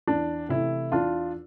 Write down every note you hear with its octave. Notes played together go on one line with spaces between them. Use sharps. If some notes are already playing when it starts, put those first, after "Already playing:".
E2 D4
C3 E3 A3 E4
E2 D4 F4